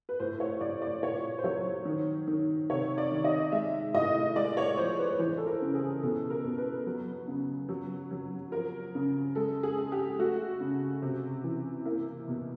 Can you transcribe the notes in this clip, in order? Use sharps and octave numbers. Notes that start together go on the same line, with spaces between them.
B4
A2 C5
C#5
A2 D5
D5
A#2 C#5
C5
F#3 C#5
D#3
D#3
C3 C#5
D5
D#3
D#5
G#3 E5
A2 D#5
G#3 D5
C#5
F3 C5
B4
E3 C5
A4
A#4
C#3
G#4
B2 A4
A#4
B2
B4
F#3
C#3
F#3
F#3
F3 A#4
C#3
G#3 A4
G#4
G#3
G4
A3 F#4
C#3
C3
E3
A#3 E4
B2